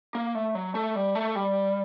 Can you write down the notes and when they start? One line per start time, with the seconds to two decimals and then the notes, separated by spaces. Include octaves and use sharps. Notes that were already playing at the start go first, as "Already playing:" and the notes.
0.15 A#3
0.35 A3
0.55 F#3
0.75 A3
0.95 G3
1.15 A3
1.35 G3